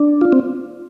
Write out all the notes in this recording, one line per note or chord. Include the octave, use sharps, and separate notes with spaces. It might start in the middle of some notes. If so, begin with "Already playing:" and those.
Already playing: D4
F4
C4